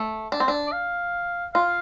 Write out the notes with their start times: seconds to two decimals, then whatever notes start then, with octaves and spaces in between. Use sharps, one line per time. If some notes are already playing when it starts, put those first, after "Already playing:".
Already playing: A3
0.32 D4
0.40 C4
0.48 D4
0.67 D5
0.72 F5
1.54 F4 F5